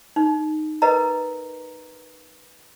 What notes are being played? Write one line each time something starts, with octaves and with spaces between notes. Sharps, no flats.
D#4
A#4 B4 D#5 A#5